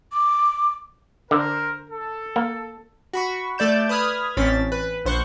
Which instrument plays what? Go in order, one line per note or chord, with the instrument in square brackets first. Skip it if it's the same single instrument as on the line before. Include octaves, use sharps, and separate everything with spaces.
[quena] D6
[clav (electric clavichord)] D3 [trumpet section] A#4 C5
[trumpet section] A4
[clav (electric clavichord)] A#3
[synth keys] F#4 B5 C#6
A3 D5 G6 E7
B4 B5 D#6 F6 G#6
A1 C4 C#4 A6 B6
B4
A#1 C5 C#6 F#6